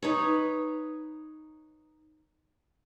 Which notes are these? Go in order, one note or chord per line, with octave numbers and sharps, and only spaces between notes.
D#4 B4 C#5